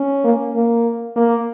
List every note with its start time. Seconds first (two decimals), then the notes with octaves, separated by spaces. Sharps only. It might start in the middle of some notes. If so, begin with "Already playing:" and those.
Already playing: C#4
0.24 A#3
0.56 A#3
1.16 A#3